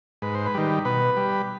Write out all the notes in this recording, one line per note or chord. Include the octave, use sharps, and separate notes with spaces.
G#2 B4
C5
B4
D#3 G3
B2 B4
G3